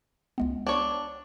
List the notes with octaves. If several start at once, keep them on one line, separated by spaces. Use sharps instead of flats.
C#2 G#3 B3
D4 C#5